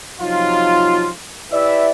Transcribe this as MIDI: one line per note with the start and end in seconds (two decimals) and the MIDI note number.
0.20 1.10 48
0.20 1.10 53
0.20 1.10 54
0.20 1.10 63
0.20 1.10 65
1.51 1.90 64
1.51 1.90 67
1.51 1.90 71
1.51 1.90 74
1.51 1.90 76